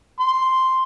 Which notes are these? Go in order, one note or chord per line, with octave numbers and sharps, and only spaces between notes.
C6